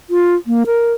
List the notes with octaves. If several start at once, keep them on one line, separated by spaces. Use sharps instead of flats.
F4
A#3
A#4